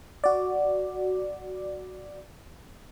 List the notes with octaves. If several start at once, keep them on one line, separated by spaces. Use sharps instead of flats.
F#4 D5